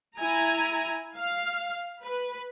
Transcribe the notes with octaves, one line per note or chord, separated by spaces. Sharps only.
E4 G#5 A#5
F5
B4